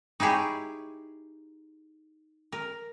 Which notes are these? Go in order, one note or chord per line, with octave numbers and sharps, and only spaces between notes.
D#4 E4 G4 G#4 C#5
A#4